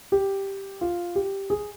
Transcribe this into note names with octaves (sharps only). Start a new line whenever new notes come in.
G4
F4
G4
G#4